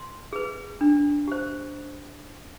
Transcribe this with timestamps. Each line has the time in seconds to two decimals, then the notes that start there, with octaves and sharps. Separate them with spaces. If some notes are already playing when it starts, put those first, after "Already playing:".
Already playing: C6
0.33 G#4 B4
0.81 D4
1.28 G4 C5